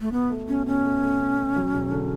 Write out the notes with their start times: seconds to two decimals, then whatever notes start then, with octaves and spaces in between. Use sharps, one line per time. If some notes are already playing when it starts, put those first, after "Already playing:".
0.01 A3
0.12 B2 B3
0.30 A3
0.48 B2 C#4
0.66 B2 C#4
0.84 A3
1.02 A3
1.19 B2
1.38 B2
1.56 F#3
1.73 E1
1.91 D3